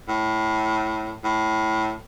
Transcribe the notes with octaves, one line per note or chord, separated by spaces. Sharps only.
A2
A2